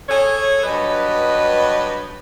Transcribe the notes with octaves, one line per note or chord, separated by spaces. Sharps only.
G#4 A4 C#5
G2 F#3 B4 D#5